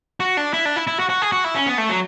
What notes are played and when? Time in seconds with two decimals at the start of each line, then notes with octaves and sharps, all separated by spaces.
0.20 F#4
0.37 D4
0.54 E4
0.65 D4
0.76 E4
0.87 E4
0.99 F#4
1.10 F#4
1.22 G#4
1.32 F#4
1.44 E4
1.55 C#4
1.67 B3
1.78 A3
1.89 F#3